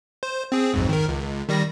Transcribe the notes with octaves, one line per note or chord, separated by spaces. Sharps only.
C5
C4 G#4
B1 F2 G#2
D#3 A#4
C#2
D#3 G3 A#6